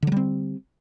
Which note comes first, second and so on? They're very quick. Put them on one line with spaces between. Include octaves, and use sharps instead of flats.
D3 F#3 G3 C4